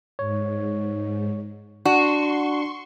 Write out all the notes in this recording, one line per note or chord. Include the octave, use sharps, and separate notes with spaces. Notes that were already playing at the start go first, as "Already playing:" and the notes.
G#2 C#5
D4 F#4 C6 C#6